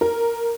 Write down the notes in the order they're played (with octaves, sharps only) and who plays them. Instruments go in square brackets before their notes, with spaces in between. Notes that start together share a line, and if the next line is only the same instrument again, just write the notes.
[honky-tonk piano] A#4